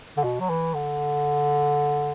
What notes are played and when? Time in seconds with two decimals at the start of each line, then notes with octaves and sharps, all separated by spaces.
0.17 D3
0.24 B2
0.40 F#3
0.49 E3
0.74 D3